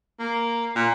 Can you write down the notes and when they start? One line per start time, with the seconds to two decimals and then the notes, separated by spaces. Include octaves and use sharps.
0.19 A#3
0.76 A#2